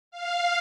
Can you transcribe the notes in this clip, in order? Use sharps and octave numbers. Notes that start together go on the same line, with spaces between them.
F5